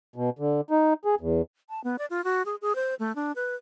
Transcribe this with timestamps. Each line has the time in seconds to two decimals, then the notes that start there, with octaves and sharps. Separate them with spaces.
0.16 B2
0.39 D3
0.71 D#4
1.05 G#4
1.21 E2
1.69 A5
1.84 B3
1.99 D5
2.10 F4
2.24 F#4
2.46 G#4
2.62 G#4
2.75 C5
2.99 A3
3.16 D4
3.36 B4